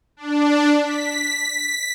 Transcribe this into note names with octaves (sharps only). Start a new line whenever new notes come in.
D4
B6